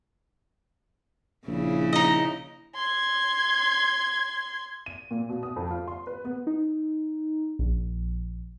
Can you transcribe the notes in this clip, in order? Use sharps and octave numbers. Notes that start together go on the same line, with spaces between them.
A#1 C#3 E4
D#4 D#5
C6 G#6
D#7
A#2
B2
D#6
F2
F4
C6
B4
B3
D#4
A#1